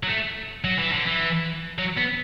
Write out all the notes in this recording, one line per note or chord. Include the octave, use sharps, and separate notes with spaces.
F#3
A3
F#3
E3
D3
E3
F#3
B3